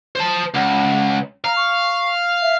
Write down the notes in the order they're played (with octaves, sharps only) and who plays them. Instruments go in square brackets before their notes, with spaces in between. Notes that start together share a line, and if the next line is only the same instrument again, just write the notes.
[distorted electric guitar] C5 A5
[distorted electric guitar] C#2 [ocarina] F#5
[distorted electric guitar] F5 [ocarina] A#5
[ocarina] C#6
E5